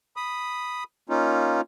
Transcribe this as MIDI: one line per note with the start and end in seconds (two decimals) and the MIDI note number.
0.17 0.84 83
0.17 0.84 87
1.09 1.61 58
1.09 1.61 61
1.09 1.61 63
1.09 1.61 65